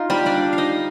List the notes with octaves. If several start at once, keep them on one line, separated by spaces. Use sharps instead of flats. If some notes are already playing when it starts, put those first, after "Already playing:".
Already playing: D#4 F4
G3 G4
D4 D5
F5
D#4 D#5